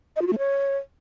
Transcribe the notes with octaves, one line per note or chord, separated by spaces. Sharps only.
D#5
F4
F#4
A3
C#5